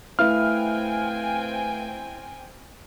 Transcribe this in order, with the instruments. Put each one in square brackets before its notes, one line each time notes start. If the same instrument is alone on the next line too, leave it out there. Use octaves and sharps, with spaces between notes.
[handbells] A3 B4 F5 [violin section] C4 G5 G#5 [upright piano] E4 [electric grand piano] F6